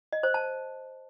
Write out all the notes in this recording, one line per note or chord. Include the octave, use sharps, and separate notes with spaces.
D#5
C5
A5